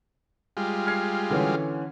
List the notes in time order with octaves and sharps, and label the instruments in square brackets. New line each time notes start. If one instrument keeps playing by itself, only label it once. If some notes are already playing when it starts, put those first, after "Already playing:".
[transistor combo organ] G3 G#3 F4
[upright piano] F6 G#6 C7
D3 E3 C#4